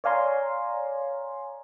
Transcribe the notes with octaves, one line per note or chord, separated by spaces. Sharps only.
C#5 D5 F5 G#5 A#5 C6